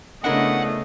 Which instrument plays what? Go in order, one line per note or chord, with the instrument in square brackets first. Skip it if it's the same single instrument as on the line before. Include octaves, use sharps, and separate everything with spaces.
[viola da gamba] C#3 B3 [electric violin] A3 D#5 [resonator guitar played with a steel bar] D4 E4 A#4 [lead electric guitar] F#5